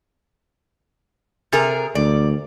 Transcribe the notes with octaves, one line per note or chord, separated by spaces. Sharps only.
C3 G#4 A#4
D2 D5